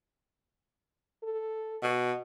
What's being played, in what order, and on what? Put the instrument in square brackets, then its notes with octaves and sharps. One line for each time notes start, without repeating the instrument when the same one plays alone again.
[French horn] A4
[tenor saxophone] B2